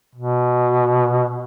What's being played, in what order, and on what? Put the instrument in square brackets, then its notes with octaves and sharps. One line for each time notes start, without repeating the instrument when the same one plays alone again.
[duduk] B2